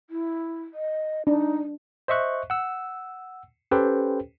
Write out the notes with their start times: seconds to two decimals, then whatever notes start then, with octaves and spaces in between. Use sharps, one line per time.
0.10 E4
0.74 D#5
1.27 D4 D#4
2.08 C5 D#5 E5 C#6 F#6
2.50 F#5 E6
3.71 C#4 G4 A4 B4 C5 G5